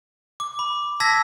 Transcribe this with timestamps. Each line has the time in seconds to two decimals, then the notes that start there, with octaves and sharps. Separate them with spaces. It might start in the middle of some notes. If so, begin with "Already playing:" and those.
0.40 D6
0.59 B5
1.00 A5 E6 G#6 A#6 B6